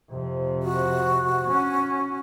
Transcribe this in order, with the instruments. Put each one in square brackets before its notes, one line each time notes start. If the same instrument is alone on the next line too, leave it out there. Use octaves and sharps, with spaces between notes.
[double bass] F2 C3
[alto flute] F#4
[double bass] C#4